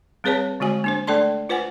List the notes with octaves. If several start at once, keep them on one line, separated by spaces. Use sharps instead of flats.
G3 C4 G#4 B4 C#5 A5
D3 G#3 F#4 G#5
A#3 D4 C5
A3 D4 A4 D5 A5 C6
F4 B4 C5 F#5 G#5